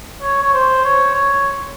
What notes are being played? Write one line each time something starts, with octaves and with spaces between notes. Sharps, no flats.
C#5
C#5
C5
C#5
C#5